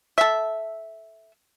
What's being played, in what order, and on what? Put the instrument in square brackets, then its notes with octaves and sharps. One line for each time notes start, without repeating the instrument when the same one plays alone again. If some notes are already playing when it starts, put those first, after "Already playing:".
[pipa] A4 E5